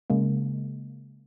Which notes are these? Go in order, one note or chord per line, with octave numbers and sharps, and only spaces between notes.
C#3 G#3 A#3